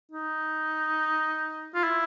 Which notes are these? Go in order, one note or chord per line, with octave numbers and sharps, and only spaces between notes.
D#4
F4
E4